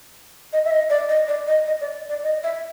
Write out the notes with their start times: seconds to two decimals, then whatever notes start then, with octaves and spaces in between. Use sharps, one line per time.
0.53 D#5
0.65 E5
0.71 D#5
0.90 D5
1.09 D#5
1.28 D5
1.47 D#5
1.67 D#5
1.81 D5
2.09 D5
2.24 D#5
2.44 E5